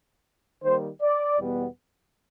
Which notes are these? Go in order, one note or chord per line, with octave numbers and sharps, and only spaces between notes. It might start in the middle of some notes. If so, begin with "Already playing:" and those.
D#3 G3 A#3 C5
D5
E2 B2 G3 B3